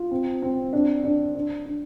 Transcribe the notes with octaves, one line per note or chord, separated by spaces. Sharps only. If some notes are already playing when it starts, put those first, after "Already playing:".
Already playing: F4
C4
C4
D4
D4
D4
D4